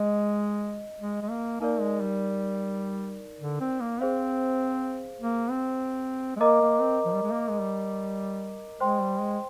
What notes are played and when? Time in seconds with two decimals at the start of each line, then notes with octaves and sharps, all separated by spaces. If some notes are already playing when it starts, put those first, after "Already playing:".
Already playing: G#3 D#5
1.00 G#3
1.22 G#3
1.30 A#3
1.60 A#3 D#4 A#4 D5
1.81 G#3
2.01 G3
3.41 D3
3.60 C4
3.81 A#3
4.01 C4 G#4 C5 F5
5.21 A#3
5.51 C4
6.36 G#3
6.40 A#3 A#4 D#5 A#5 D6
6.61 A#3
6.81 C4
7.06 F3
7.14 G3
7.23 G#3
7.31 A#3
7.49 G#3
7.61 G3
8.80 G#3 C5 G5 C6
9.01 G3
9.21 G#3